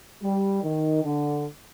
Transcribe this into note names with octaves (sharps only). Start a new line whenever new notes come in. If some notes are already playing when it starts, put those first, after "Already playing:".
G3
D#3
D3